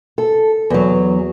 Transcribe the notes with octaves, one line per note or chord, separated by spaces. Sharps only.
A4
E2 F#3